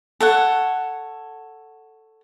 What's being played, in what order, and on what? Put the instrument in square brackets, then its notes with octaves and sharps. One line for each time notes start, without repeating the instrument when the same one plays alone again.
[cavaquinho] A4 C#5 F#5